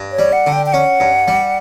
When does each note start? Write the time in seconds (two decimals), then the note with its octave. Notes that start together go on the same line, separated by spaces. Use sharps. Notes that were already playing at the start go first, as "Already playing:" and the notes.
Already playing: G2
0.12 C#5
0.19 G3
0.33 F#5
0.47 D3
0.53 G5
0.66 G5
0.73 C#4 F#5
1.00 G2
1.28 G3